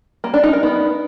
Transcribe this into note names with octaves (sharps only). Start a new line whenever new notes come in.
A#3
D4
D#4
A#4
B3